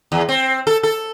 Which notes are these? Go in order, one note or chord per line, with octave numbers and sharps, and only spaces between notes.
E2
C4
A4
A4